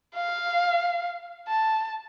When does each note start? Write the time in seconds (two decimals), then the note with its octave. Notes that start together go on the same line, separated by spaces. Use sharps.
0.16 F5
1.48 A5